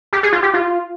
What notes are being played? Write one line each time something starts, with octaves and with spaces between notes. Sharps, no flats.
G4
G#4
F4
G4
F4